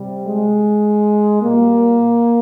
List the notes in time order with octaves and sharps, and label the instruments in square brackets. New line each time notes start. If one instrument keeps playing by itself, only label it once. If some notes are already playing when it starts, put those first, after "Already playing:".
Already playing: [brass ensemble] C3 G3
G#3
A#2 G3 A#3